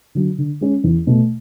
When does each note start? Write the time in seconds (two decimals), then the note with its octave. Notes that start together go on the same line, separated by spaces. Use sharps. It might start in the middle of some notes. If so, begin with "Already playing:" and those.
0.15 D3 F#3
0.38 D3
0.61 G#3 C#4
0.84 E2
1.07 B2 A3